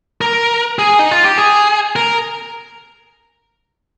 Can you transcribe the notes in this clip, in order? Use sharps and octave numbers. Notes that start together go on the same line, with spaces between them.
A#4
G#4
D#4
F4
G4
G#4
A#4